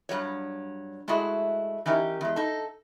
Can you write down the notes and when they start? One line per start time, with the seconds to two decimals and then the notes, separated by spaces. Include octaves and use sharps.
0.09 G2 F3 F#3 C#5
1.08 G#3 A3 E4 F#4 G#4
1.86 E3 C#4 D#4 G4 A#4
2.21 E2 G#3
2.36 D#4 A4